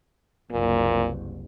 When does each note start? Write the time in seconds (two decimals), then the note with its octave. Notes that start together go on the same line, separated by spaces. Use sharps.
0.52 F#1 C2 A#2